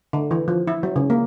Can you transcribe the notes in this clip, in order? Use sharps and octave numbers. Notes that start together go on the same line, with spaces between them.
D3
E3
F3
E4
F#3
C#3
A#3